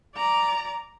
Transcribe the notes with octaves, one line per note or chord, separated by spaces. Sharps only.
D5 A#5